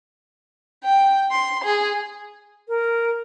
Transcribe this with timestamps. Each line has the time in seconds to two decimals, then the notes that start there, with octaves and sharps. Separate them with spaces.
0.84 G5
1.31 C6
1.64 G#4
2.68 A#4